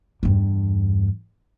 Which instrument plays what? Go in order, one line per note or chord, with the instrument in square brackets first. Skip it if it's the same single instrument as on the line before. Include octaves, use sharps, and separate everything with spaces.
[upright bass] E2 G2